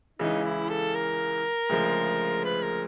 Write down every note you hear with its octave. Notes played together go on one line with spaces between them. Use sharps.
C#2 C#3 E3 D#4
E4
A4
A#4
D2 C#3 F3 G#3
B4
A#4